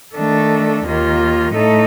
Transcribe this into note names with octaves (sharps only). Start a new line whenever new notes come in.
D#3 A3 D4 A4
D#2 D#3 A#3 F4
A2 A3 D#4 A4